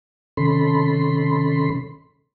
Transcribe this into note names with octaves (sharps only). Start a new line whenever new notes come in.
C3 D#3 C#4 A4 B5 C6